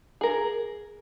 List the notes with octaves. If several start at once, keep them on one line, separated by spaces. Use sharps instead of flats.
G#4 A#4